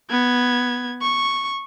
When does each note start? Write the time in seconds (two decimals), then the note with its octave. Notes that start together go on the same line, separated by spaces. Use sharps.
0.10 B3 G#6
1.02 C#6